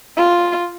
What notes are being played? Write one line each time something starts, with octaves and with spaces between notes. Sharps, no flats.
F4